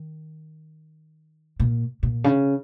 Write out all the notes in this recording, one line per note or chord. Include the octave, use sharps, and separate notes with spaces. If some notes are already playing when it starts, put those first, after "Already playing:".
Already playing: D#3
A#2
A#2
C#3